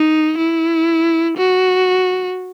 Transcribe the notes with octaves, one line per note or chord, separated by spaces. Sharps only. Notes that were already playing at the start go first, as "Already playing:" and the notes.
Already playing: D#4
E4
F#4